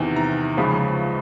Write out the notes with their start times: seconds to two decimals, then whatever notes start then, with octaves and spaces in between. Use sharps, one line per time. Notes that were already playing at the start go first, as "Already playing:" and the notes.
Already playing: E2 C3 D#3
0.16 A#5
0.57 C#2 C#3 F3 B5